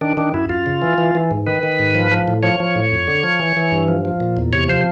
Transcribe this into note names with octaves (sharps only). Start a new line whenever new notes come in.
D#3 D4
D#3 D4
F#2 E4
F#2 F4
C#3
E3
E3
E3
G#2
D#3 B4
D#3
G#2
F3
F3
A2
F3 C#5
F3
A2
F2
D3
F3
E3
E3
G2
F3
F3
A#2
E2
C3 C#5
F3 C5